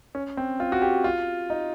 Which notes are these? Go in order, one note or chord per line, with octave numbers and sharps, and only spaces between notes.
C#4
C4
F4
F#4
G4
F4
D#4